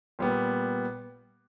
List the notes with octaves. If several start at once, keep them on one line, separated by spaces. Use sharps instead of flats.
A#2 G3 B3